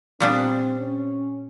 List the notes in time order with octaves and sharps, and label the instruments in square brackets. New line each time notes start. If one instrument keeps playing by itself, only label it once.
[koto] A#2 G3 B3 D4 [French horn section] C4
[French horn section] C#4